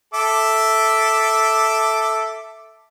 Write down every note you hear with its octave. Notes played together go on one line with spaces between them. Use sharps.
A4 E5 D6